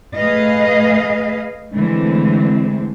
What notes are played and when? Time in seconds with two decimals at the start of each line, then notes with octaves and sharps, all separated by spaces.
0.15 A3 G#4 B4 D#5 F5
1.74 D3 E3 G#3 A3 C4